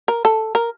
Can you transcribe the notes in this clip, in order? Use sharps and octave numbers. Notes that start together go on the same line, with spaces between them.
A#4
A4
A#4